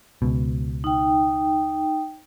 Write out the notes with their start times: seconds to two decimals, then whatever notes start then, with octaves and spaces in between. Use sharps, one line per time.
0.22 C#2 B2
0.84 D#4 G5